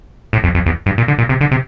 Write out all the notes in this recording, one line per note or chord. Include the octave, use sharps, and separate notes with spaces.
A2
F2
F2
E2
G2
A#2
D3
A#2
C3
D3
C3